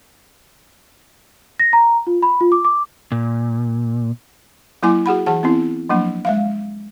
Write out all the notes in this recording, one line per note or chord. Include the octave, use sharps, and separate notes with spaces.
A#6
A#5
F4
B5
F4
D6
D6
A#2
F#3 A#3 E4 G#5 D6
F#4 G#4 F#5 B5
E3 G#4 F#5 A5
B3 C4 E4
F3 F#3 A#3 D4
G#3 E5 F5